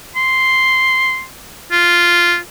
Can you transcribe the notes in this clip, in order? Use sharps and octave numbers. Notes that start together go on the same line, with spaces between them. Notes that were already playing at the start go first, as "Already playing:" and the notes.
C6
F4